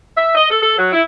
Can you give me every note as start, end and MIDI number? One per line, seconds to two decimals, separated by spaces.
0.16 0.32 76
0.35 0.50 75
0.50 0.60 69
0.61 0.75 69
0.77 0.89 54
0.92 1.00 64